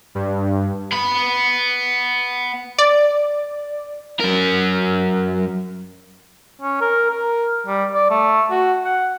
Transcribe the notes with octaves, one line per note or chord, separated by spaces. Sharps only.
G2
B3 B5
D5
F#2 A#4
C#4
A#4
A#4
G3
D5
A3
F#4
F#5